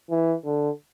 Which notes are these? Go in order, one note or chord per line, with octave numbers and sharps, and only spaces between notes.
E3
D3